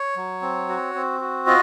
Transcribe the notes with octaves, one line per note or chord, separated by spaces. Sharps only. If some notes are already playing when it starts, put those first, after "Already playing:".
Already playing: C#5
F#3
C4
F#4
C4
F#4
F4 D#5